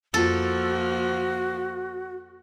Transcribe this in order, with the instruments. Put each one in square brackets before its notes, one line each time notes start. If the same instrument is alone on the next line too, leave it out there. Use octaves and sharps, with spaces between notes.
[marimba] F2 F4 [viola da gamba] F3 A#3 [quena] F#4 [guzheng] A4